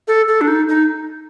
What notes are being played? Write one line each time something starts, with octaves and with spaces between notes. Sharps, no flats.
A4
A4
D4
D#4
D#4